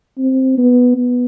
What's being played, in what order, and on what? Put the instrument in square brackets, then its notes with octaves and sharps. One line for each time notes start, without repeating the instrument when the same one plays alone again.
[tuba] C4
B3
B3